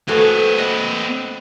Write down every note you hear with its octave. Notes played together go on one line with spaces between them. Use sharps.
A3 C4 F#4 B4 G#5
D#5 F#5